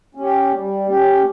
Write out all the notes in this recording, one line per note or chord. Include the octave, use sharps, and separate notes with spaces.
C#4 G4
G3
C#4 G4